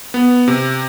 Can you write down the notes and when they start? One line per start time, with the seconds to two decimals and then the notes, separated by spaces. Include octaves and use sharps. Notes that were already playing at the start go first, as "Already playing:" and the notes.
0.14 B3
0.48 C3